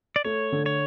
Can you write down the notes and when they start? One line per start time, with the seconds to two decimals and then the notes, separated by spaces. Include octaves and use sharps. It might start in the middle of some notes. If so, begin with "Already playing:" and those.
0.16 D5
0.25 A3 C#5
0.52 D3
0.66 C#5